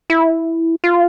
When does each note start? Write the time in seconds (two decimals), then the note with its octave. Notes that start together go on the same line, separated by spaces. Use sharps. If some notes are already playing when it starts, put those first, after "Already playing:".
0.10 E4
0.84 F4